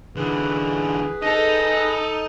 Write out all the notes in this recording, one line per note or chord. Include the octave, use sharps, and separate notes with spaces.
D3 E3 G#4 B4
D#4 A4 D#5